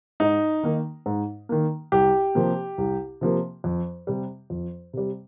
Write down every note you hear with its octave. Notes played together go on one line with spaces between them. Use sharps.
G#2 D#4
D#3 A#3
G#2
D#3 A#3
C2 G4
C3 F3 A#3
C2
C3 F3 A#3
F2
C3 G3
F2
C3 G3